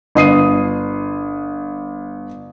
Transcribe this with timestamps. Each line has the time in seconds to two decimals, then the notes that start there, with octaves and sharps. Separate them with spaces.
0.15 G1 D#6 C7 D#7